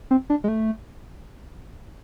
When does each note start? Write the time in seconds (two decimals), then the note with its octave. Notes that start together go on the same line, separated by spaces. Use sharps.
0.11 C4
0.30 D4
0.44 G#3
0.48 A3